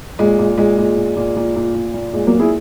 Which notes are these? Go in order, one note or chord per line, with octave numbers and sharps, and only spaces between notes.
A#2 G#3
A#2
A#2 G#3
A#2
A#2
A#2
A#2
A#2
A#2
A#2
A#2 G#3
F#3 A#3
A#2
E4 G#4